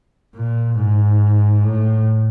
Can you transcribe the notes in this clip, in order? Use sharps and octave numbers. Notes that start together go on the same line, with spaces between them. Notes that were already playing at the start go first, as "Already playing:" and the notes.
A#2
G#2
A2